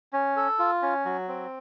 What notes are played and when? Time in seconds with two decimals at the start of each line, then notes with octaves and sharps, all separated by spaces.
0.13 C#4
0.36 A4
0.59 F4
0.82 C#4
1.05 F#3
1.28 C4